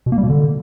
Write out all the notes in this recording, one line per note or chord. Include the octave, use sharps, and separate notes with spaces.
B2
A#3
G3
B2
D3